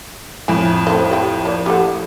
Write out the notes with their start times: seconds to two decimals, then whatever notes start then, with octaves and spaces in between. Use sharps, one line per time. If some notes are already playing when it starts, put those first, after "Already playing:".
0.48 F2 A2 G#5
0.87 A3 C4 D#5
1.10 G4 D5 G5
1.45 A#3 D5
1.66 G4 A4 F#5